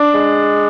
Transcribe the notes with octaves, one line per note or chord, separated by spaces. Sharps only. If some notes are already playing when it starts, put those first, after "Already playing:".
Already playing: D4
G#3